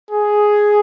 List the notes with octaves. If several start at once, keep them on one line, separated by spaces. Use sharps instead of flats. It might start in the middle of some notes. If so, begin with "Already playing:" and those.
G#4